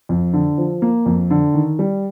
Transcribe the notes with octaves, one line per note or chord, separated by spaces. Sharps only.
F2
D3
F3
A#3
F2
D3
D#3
G3